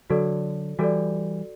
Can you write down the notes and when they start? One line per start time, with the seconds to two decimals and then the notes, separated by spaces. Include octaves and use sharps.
0.10 D3 F#3 F#4 A4 D5
0.79 E3 G3 F#4 A4 D5